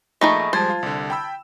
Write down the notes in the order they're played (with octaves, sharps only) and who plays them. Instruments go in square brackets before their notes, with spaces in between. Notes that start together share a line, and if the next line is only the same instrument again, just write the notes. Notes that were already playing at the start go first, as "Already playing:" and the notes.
[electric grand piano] A#1 A#2 [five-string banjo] A3 D#4 G#4 [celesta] B5 C#6 A#6
[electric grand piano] F3 G3 G#3 [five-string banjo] C5 [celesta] A5 G#6 A6
[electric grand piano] F4
C2 D3
G5 B5 E6